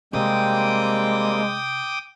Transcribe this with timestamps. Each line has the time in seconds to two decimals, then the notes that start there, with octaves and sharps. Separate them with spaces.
0.13 C3 G3 G#3 A#3 C4 G5 D6 D#6